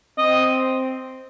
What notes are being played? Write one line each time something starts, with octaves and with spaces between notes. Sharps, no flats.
C4 D#5